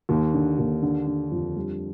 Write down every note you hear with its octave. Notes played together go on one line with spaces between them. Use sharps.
D#2
D3
D#2
D3
D3
F2
G3